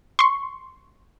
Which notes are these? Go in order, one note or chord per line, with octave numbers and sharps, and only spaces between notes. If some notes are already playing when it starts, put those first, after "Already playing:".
C6 C#6